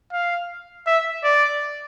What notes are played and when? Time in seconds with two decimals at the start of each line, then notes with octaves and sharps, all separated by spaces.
0.13 F5
0.87 E5
1.24 D5